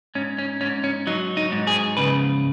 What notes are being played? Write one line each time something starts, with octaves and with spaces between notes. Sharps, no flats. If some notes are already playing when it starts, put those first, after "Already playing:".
G#2 C#4
C#4
G#2 C#4
C#4
F#3 D#4
D#4
G#2
G#4
C#3 B4